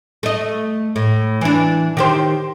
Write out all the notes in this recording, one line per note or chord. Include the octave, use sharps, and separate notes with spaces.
A3 D#5
A2
E3 D4
D#3 G4 C5